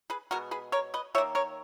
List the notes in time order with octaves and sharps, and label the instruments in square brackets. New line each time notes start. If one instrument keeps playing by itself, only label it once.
[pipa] G#4 B4
B2 G#3 B3 F#4 A#4
G#4 B4
A#4 C#5
B4 D#5
D#3 C#5 E5
A#3
A#4 C#5